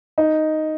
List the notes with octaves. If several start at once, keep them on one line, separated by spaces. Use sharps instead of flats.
D#4